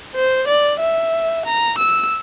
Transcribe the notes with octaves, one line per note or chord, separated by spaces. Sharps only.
C5
D5
E5
A#5
E6